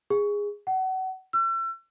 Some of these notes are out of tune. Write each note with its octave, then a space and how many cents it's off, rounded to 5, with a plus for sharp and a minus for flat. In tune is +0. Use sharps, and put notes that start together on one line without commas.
G#4 -15
F#5 +30
E6 +40